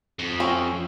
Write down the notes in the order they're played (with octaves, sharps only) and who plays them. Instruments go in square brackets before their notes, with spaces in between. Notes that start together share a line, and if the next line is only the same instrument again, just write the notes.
[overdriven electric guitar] F2
[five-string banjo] C4 C#4